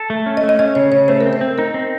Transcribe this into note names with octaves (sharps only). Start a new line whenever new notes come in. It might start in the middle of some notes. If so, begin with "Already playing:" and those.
Already playing: A4
A3
C#4
D#5
A3
D#5
C#4 D#5
C#3 C#5
C#3 C#5
A3 C5
A#4
C4
C5
C4
D#4 A#4
C4